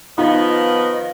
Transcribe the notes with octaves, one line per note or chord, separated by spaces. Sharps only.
D#3 F3 B3 D#4 F4 D#5